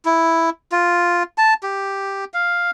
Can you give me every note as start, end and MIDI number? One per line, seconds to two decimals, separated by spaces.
0.05 0.50 64
0.72 1.23 65
1.38 1.54 81
1.63 2.25 67
2.34 2.71 77